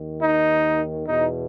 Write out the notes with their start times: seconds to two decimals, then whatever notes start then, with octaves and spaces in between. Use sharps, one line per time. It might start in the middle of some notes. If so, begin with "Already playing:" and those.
Already playing: D#2 D#3
0.22 D#4
1.07 E2 B2 D#4